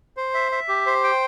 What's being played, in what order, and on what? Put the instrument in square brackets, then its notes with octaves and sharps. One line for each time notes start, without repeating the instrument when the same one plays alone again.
[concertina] C5
E5
E5
G4
C5
G5